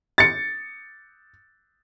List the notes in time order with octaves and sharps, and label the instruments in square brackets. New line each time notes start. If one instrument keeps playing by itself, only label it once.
[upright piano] A6 C#7